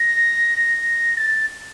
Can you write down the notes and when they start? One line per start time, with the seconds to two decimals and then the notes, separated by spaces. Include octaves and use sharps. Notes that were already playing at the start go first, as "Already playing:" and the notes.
Already playing: A#6
1.17 A6